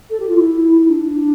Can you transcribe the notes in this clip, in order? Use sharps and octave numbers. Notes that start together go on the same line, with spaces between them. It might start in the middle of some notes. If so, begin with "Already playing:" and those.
A4
G4
F4
E4
E4
D4